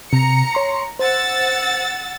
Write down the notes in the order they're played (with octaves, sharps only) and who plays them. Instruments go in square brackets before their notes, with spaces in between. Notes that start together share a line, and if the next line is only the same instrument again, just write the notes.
[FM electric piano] C3 [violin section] A#5 C#7
[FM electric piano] C#5 C6
[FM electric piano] C5 [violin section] F#5 E6 A6